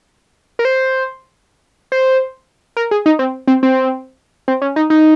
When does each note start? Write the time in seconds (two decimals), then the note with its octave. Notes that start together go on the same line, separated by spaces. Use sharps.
0.59 A#4
0.65 C5
1.92 C5
2.77 A#4
2.91 G#4
3.06 D#4
3.19 C4
3.48 C4
3.63 C4
4.48 C4
4.62 C#4
4.76 D#4
4.90 D#4